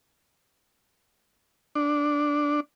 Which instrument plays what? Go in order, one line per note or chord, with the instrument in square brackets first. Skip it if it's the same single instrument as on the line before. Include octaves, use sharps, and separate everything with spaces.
[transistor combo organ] D4